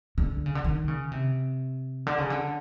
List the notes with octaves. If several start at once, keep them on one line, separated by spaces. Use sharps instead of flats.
D3
C#3
D3
D#3
C#3
C3
D3
C#3
D3